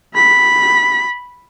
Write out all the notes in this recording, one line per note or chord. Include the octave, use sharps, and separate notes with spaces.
B5 B6